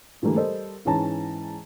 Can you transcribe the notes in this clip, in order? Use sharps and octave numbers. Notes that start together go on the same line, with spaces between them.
G#2 D3 E3 G3 A3 A#3
G3 A4 A#4 C5 D#5
G#2 E3 C#4 A5 A#5